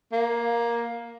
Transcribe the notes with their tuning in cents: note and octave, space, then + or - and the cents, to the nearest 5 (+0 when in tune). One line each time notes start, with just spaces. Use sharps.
A#3 +10